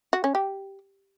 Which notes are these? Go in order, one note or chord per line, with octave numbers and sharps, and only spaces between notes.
F#4
C#4
G4